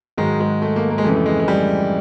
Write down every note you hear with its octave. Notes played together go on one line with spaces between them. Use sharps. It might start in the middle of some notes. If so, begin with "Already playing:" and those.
G#2 D#3 F#3 G#3
G#3
A3
A#3
A#3
G#3
F2 C#3 E3 A3
A3
G#3
G#3
G3